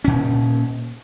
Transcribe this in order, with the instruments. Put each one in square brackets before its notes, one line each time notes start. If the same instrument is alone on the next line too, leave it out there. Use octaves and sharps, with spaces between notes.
[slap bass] A#2 C#4